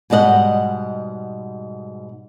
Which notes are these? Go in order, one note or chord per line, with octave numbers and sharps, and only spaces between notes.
G#2 B2 G3 D#5 F#5